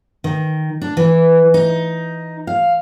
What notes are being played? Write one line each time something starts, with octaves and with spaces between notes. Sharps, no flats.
D#3
D4
E3
D#4
F5